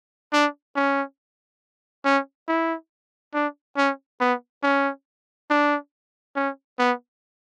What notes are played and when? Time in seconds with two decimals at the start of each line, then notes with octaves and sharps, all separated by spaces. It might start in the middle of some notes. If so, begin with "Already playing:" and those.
0.33 D4
0.76 C#4
2.05 C#4
2.48 E4
3.34 D4
3.77 C#4
4.21 B3
4.63 C#4
5.50 D4
6.36 C#4
6.79 B3